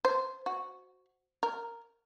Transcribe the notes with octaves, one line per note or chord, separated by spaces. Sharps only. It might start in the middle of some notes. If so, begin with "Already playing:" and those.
C5
F#4
A#4